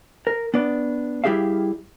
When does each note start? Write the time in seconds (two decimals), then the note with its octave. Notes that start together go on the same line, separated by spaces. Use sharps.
0.27 A#4
0.54 B3 D4 D5
1.24 G3 E4 G4 G#4 E5 F5